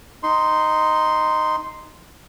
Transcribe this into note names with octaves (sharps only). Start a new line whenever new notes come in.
D#4 C6